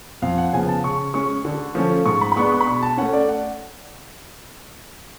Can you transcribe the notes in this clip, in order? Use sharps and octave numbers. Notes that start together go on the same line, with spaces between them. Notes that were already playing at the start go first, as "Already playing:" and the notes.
F2 F5
F#5
C#3 F3 B3 G#5
A5
C#3 C#6
G#3 C#4 C#6
D3
F3 A3 C#4
G#2 C#6
B5
B5
G#3 B3 D4 C#6
C#6
B5
B2 C#6
A5
A3 C#4 F#5
D5
F#5